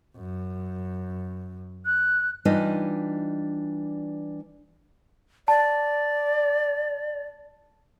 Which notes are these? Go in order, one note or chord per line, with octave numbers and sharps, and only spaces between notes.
F#2
F#6
E3 G3 D4 D#4 F4 D#5
D5 A5